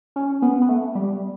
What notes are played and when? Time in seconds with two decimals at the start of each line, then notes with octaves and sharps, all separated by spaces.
0.16 C#4
0.42 B3
0.62 B3
0.69 A3
0.95 G3